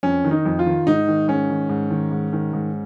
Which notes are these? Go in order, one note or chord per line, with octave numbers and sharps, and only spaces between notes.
F2 C#4
D#3
D#4
F2
F4
D#3
G#2 D#4
D#3
G#2 C#4
D#3
G#2
D#3
G#2
D#3
G#2